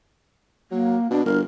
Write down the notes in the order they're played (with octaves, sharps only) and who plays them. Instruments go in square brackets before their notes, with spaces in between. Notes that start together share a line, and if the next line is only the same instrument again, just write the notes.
[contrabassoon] F#3 [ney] A#3
[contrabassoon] B2 [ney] D4
[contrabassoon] G1 [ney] A#4